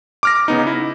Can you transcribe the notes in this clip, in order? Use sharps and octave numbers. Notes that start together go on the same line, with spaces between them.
D6 F6 A#6
C#3 B3 D#4
E4